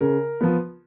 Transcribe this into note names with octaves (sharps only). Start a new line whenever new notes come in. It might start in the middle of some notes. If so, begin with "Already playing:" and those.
C#3 A#4
F3 B3